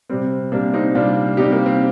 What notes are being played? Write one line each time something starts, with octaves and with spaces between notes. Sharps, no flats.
C3 G3 C4
C3 G3 A#3 D4
C4 D#4
C3 G3 D4 F4
C3 G3 D#4 G4
A#3
C4